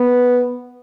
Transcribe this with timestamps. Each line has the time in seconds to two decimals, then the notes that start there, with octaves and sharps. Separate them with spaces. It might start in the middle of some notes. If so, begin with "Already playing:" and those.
Already playing: B3